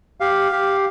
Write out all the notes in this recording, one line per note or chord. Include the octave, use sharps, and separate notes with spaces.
G4 F5
G4